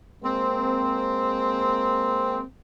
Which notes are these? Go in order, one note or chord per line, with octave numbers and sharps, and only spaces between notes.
G#3 A#3 C4